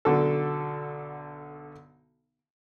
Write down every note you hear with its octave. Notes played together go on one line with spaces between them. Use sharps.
B1 D3 F#4 A4